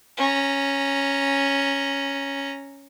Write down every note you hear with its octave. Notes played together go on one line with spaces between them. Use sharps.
C#4 A#5